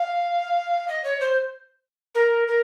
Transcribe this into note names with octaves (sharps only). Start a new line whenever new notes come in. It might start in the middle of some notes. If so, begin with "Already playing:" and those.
Already playing: F5
D#5
C#5
C5
A#4
A#4